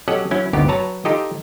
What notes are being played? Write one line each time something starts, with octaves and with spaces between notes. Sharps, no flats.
F#3 C#4 G4 A4 D#5 F#5
F#3 C#4 E4
G1 D2 C3 B3 D#4 G4
F#3 B4 C#5 A5 A#5
D#4 F4 G4 A4 D#5